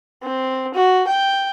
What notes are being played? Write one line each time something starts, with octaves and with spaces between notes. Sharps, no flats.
C4
F#4
G5